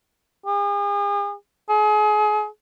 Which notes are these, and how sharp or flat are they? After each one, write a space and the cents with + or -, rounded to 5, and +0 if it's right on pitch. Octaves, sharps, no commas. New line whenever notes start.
G#4 -40
G#4 +30